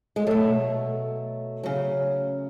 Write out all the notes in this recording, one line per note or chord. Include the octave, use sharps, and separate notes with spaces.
G#3
B2 F#3 A3
C#3 F#3